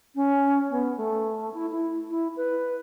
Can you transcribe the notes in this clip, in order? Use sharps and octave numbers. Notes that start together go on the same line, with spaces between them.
C#4
B3
A3
E4
E4
E4
B4